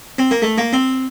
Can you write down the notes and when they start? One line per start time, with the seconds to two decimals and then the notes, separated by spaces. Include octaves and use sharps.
0.19 C4
0.31 A#3
0.42 A3
0.58 A#3
0.73 C4